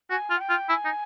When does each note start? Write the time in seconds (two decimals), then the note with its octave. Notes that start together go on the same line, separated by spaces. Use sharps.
0.10 F#4 G#5
0.30 F4
0.36 F#5
0.41 G5
0.49 F4
0.69 E4 G#5
0.85 D#4